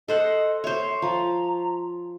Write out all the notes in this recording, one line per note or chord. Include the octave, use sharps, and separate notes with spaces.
A4 C5 D#5 F#5
C5 C#5 E5
F3 A#5